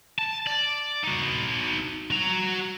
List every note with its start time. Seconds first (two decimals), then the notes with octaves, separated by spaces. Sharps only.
0.19 A5
0.47 D5
1.04 D#4 F#4
2.11 F#4 A#5